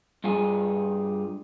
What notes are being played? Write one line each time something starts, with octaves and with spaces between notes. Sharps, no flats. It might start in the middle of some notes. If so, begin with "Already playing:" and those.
G2 G3 F4 G#4